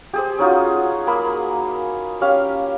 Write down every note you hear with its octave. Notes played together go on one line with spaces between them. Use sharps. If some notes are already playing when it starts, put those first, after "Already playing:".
G4 G#4 C5
C#4 D#4 F4 F#4
A#3 G#4 B5
C#4 G4 F5